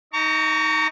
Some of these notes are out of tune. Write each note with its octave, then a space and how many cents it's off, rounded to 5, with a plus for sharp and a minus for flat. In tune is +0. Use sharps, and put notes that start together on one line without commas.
D#4 +15 A#5 -25 C#6 +30